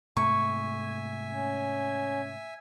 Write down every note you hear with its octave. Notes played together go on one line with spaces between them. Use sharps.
G#2 C3 A3 E5 G#5 C#6
C#4